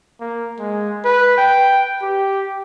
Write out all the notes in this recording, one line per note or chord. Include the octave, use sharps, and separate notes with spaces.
A#3
G#3
B4
G5
G4